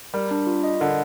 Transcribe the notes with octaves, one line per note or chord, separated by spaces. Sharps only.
G3 A#4
D4
F4
D#5
D3 A#4